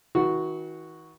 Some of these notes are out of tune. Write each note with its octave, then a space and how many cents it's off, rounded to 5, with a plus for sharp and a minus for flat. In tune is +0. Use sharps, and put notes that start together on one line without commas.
E3 -45 F#4 +0